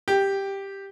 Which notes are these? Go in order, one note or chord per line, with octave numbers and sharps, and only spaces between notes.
G4